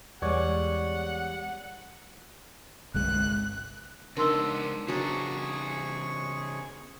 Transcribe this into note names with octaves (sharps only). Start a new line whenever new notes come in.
E2 G3 G#3 C#5 D5 F#5
G1 C2 G#3 F#6
C#2 B3 D4 D#4 A#4 C6 E6
C#3 F#3 B3 D4 G#4 C#6